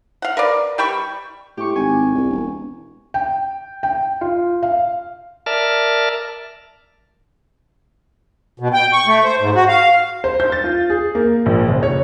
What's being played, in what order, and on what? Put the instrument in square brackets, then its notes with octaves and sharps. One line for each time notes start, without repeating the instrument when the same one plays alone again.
[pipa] F5 F#5
A#4 B4 D5
G3 G5 B5 C#6
[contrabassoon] A2 [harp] G4 C#6
[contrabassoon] G#1 [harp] G#5
[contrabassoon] C2
E1
[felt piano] G5
G5
F4
F5
[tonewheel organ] A#4 D5 E5 A5 F6
[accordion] B2
G5
C#6
A3
C5
G#2
F#4
F5
[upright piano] C5
G6
A6
F4
G#4
A#3
A#1
F#1
C#5